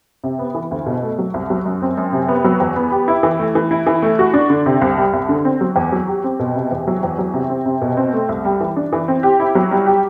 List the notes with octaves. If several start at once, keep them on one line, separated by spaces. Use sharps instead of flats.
C3
B3
E3
D2
B2
A3
F#3
C2
F#3
F#2
C4
F#2
C3
B3
F#3
E2
B3
G4
E4
E3
A3
E3
E4
E3
A3
F#4
D4
D3
C3
C2
G3
C2
D3
C4
F#3
E2
F#3
G4
C4
B2
C3
E2
F#3
E2
F#3
C3
C4
C3
B2
C4
A3
C2
G3
E3
D4
E3
C4
G4
E4
F#3
G3
G4